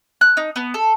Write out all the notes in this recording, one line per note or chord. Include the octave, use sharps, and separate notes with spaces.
F#6
D#4
B3
A4